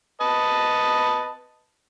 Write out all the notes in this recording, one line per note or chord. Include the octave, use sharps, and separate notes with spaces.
B4 D#5 A5